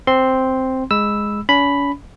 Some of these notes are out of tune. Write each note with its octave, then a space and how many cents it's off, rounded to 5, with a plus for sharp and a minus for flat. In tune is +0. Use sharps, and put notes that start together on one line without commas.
C4 +0 C6 +0
G#3 +0 B5 +0 E6 +0
C#4 +40 B5 +0